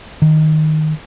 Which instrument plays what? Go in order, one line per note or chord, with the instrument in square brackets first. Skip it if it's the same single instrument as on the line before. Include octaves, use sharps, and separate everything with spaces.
[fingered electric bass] D#3